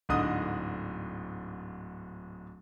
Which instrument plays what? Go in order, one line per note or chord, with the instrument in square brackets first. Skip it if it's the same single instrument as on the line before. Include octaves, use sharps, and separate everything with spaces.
[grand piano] D1 G#2 D3 D#5 D#6